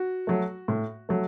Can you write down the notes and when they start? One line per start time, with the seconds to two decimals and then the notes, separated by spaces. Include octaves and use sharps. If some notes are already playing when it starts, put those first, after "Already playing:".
Already playing: F#4
0.27 F#3 A3
0.68 A2
1.09 F#3 A3